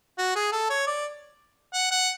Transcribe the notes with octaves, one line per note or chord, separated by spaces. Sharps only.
F#4
G#4
A4
C#5
D5
F#5
F#5